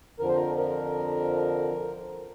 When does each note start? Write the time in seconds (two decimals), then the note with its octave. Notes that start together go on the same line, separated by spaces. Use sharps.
0.19 F2 D3 F3 A#4
0.28 C5
0.35 A#4
0.58 A#4